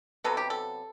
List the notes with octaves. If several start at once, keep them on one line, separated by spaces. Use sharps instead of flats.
C3 F#3 B3 A4
G4
A4